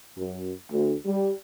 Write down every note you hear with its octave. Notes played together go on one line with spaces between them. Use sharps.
F#2
D2
G3